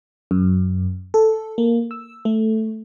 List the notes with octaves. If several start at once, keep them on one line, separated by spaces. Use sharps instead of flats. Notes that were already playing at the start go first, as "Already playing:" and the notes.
F#2
A4
A#3
E6
A3